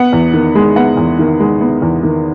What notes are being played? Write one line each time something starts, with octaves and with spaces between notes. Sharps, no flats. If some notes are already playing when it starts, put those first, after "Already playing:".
Already playing: B3 F#5
E2
D#3
G#3
B3 F#5
E2
D#3
G#3
B3
E2
D#3